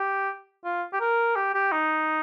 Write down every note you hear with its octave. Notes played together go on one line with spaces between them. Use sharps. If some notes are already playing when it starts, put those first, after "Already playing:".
Already playing: G4
F4
G4
A#4
G4
G4
D#4